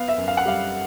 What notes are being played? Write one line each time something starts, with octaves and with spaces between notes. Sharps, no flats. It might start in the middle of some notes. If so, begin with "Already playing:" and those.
Already playing: B3 F5
E5
F#2
F5
F#5
G3 F5